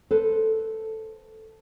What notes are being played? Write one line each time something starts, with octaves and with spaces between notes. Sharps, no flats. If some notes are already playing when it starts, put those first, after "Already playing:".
A4 B4 C5